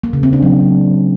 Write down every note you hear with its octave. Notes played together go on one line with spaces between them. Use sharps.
A#3
C#3
C4
D4
F#3